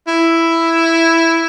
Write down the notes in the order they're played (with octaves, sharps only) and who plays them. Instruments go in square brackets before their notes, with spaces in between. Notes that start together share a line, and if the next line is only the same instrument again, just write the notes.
[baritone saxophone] E4